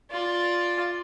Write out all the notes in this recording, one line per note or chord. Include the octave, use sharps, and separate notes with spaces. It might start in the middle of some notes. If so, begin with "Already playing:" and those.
F4 D5